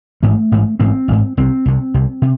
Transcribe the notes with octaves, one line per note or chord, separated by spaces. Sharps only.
A1 G#2 A3
A1 G#2
A1 G#2 C4
A1 G#2
C2 C3 C4
C2 C3
C2 C3
C3